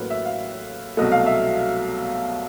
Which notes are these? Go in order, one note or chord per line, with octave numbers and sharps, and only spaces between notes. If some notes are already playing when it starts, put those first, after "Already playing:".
Already playing: A1 A2 F#3 A#3 B4
E5
F5
C2 B2 F#3 A3 D#5
F5
E5